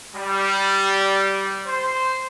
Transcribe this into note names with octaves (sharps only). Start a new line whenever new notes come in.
G3
C5